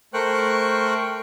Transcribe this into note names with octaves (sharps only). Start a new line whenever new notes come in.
A3 A#4 C5 G5 C#6 F#6